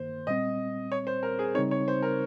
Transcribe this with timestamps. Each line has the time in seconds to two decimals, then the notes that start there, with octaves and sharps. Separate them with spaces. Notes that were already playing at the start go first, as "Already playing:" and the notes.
Already playing: G2 D#3 A#3 C5
0.27 A#2 G3 C4 D#5
0.92 C#5
1.07 C5
1.23 A#4
1.39 G#4
1.55 C#3 G3 C4 D#4 C#5
1.71 C#5
1.88 C5
2.03 A#4